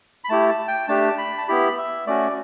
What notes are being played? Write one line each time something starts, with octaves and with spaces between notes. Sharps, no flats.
B5
A3 E4 G4 A5
A5
G5
A3 D4 G4 A5
B5
A5
B3 E4 G4 B5
E5
A3 C#4 F#4 D5